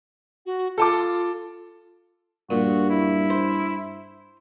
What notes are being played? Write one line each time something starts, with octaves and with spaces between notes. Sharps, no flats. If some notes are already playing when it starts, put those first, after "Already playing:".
F#4
F4 A4 A5 D6
G2 A#2 F#4
E4
C5